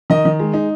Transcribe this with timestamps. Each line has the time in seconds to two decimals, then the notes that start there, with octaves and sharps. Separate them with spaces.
0.10 D#3 D#5
0.25 D#3
0.39 G#3
0.54 D#4